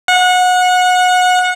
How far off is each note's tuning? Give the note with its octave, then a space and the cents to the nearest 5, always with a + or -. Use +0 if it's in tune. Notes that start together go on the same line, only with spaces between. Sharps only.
F#5 -25